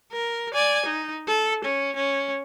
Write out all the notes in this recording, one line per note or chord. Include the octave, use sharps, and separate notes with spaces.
A#4
D5 G#5
D#4
A4
C#4
C#4